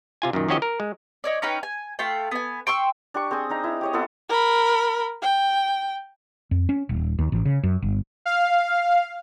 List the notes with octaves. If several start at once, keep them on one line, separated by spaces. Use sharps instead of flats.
C3 F4 G#5
F#2 A#2 D#3
D#3 F3 C#4 F#4 G4 D#5
A#4
G#3
D#4 C#5 D5
C#4 D#4 B4 G5
G#5
A3 F4 G5
B3 G#5
G5 C6 C#6 E6
D4 G4 C#6
C4 G#4 C5 D#6
D4 D#4 A#5
E4 D#6
G4 C#5 D#5
B3 C4 E4 A4
A#4 B5
G5
F2
C#4
D#1
D#2
A1
C#3
F#2
G1
F5